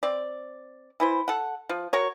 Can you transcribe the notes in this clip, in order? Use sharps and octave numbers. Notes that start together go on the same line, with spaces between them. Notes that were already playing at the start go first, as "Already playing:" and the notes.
C4 D5
E3 E4 C5
A4 F#5
F3
F#4 A#4 C#5